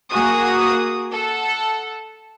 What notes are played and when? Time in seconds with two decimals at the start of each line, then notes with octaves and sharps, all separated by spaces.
0.10 A#3 F#4 G#4 D#6
1.12 A4 F#5